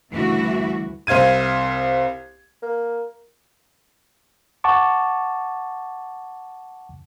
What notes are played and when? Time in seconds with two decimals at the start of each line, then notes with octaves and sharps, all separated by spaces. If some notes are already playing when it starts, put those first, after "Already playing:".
0.10 D2 G2 C#3 E3 E4 F#4
1.07 C2 C5 F5 G#6 D#7
2.62 A#3
4.64 F#5 A5 C#6 D6